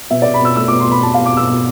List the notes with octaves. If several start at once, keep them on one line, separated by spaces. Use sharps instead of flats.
B2 E5
B2 D5
B5
B2 E6
A3 E6
B2 D6
C6
B2 B5
B2 A5
B2 F5
D6
B2 E6
B2